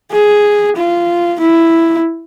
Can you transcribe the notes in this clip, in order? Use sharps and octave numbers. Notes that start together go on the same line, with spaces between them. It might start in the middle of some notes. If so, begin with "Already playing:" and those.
G#4
F4
E4